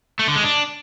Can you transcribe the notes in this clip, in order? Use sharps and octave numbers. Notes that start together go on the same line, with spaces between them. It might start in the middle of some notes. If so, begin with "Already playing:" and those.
A3
D3
G#3
D4